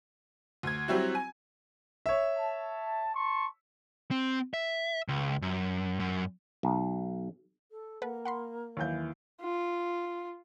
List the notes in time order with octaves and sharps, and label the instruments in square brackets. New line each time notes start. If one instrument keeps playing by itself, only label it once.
[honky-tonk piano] D2 G#6
F#3 G3 C4 E4 F#4
G#5
[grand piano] C#5 E5
[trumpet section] A5
A5 C6 C#6
[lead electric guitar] C4
E5
C#2
F#2
F#2
[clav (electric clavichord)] B1
[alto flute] A4
[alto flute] A#3 [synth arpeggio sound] A4 B4 F#5
[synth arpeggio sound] F#5 B5 C6
[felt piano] D#2 E3 G6 [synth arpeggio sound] F#3 C#5
[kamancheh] F4